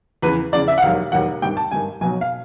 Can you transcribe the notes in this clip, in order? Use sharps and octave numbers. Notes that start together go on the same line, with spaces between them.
E2 C#3 E3 B4
E2 C#3 E3 D5
E5
F#5
E1 D#2 D#3 F#3 F5
E1 D#2 D#3 F#3 F#5
G#1 G2 D#3 G5
A5
G#1 G2 D#3 G#5
B1 B2 F#3 G#5
F5